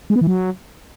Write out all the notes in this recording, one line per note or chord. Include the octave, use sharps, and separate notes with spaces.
G#3
B3
E3
F#3